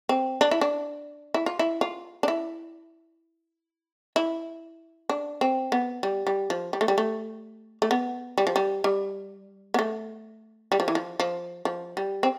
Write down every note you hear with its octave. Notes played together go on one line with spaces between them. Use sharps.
C4
D4
E4
D4
E4
F4
E4
F4
D4
E4
E4
D4
C4
B3
G3
G3
F3
G3
A3
G3
A3
A3
B3
G3
F3
G3
G3
B3
A3
G3
F3
E3
F3
F3
F3
G3
C4